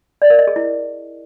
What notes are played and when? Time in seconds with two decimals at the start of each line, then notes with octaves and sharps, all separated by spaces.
0.22 D5
0.30 A#4
0.39 D#5
0.47 G#4
0.56 E4